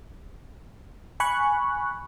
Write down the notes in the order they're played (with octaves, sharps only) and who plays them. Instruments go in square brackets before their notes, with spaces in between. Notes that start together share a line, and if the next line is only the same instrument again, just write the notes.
[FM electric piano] G#5 B5 C#6 F#6